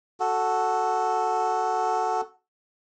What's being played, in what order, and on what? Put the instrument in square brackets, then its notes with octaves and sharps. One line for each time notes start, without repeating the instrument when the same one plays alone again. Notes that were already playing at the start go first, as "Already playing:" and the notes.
[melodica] F#4 A4